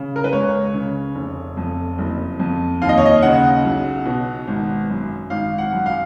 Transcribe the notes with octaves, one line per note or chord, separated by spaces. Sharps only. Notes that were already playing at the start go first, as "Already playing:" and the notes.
Already playing: C#3
A#4
B4
C#2 C#5
C#3
F1
F2
F#1
F2
D#2 F5
D#5
C#5
D#5
C#3 F#5
B1
B2
G#1
F#2
G#1 F5
F#5
F#2
F5